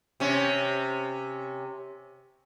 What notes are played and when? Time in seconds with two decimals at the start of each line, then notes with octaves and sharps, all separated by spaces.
0.20 C3 C#4